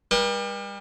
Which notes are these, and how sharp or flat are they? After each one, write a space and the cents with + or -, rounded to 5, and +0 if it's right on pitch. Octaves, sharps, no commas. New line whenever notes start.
G3 +35 B4 -40